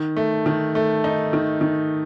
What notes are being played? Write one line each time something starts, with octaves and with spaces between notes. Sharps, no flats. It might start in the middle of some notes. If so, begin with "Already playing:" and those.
Already playing: D#3
A3
D#3
A3
D#4
D#3
D#3